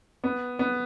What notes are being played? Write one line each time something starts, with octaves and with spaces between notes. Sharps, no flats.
B3
B3